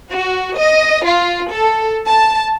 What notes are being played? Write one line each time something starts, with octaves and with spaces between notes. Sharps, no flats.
F#4
D#5
F4
A4
A5